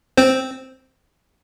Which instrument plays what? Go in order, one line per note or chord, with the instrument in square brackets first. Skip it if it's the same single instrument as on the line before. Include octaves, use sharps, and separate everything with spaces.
[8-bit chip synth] C4 C5